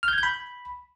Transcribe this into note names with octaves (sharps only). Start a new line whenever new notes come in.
F6
G6
G#6
G6
B5